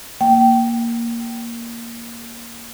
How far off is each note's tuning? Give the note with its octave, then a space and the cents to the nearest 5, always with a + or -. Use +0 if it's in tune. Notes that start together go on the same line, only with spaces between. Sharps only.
A#3 +0 G5 -20